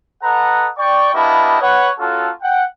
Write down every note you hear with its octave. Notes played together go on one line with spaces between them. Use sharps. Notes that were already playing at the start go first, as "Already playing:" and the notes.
A4 B4 D#5 F#5 A#5
D5 G5 C#6
A#3 B3 D4 E4 G4 D#5
B4 C#5 F#5
A#3 C#4 F4 F#4 A4
F#5 G5